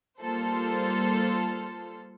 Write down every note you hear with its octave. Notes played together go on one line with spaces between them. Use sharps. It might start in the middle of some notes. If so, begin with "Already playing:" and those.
G3 A#3 F4 A4 C5